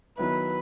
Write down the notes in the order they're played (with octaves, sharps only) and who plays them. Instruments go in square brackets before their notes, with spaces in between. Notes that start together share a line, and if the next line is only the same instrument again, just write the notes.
[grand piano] D#3 F#3 B3 E4 [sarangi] B4